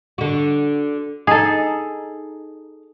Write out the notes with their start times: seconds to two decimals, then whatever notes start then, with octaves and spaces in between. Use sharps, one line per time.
0.18 D3 F#4
1.27 D#4 G#4 A4